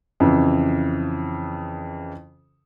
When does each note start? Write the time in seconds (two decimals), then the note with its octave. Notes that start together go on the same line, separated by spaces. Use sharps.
0.20 F2 C#3 E3